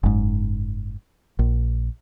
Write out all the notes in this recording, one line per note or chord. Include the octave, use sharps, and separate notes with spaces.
F#1 G#2
A#1